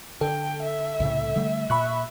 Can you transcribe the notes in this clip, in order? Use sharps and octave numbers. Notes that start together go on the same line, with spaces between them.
D3 A4 G5
E5
C2 A2 C#3
D3 G3 A3
A#2 E5 B5 C#6 F#6